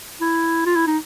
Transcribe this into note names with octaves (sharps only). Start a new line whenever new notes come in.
E4
F4
E4
D#4